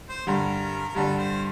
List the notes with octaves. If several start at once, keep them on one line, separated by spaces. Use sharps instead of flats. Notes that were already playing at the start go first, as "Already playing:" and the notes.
C5
G2 D3 G3 A#4
A#4
G2 D3 G3 A4
C5